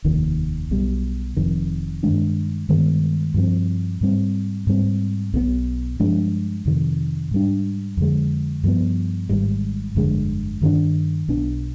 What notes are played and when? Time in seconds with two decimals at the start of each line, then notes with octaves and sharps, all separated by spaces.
0.04 F1 D#2 D#3
0.71 B1 B2 G3
1.37 F1 F2 D#3
2.03 G2 D#3 G#3 D4
2.69 G2 D#3 G#3 B3
3.34 G2 F3 C4
4.01 G#2 G3 C4
4.67 G#2 G3 C4
5.33 B1 B2 G3 B3
5.99 G2 F3 G#3 D4
6.66 F2 C3 D#3
7.31 G#2 G3 D4
7.97 F2 D3 G#3
8.64 G2 F3 B3
9.29 G#1 G#2 G3
9.95 G1 F2 D3 G#3
10.62 G2 D#3 B3 D4
11.28 B1 B2 B3 D4